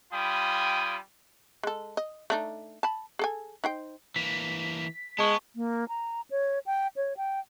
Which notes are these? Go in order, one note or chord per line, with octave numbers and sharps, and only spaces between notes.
G3 F4 G5 G#5 B5 D#6
G#3 A4
D#5
A3 D4 D#4
A5 B5
G#4 A4 G#5
D#4 C5 G5
E3 A#3 B6
G#3 B3 A5 C#6
A#3
A#5
C#5
G5
C#5
G5